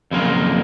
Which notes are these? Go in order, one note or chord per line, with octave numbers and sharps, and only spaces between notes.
F2 C#3 F#3 A#3 F4